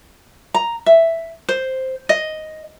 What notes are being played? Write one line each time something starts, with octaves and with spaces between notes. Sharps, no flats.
A#5
E5
C5
D#5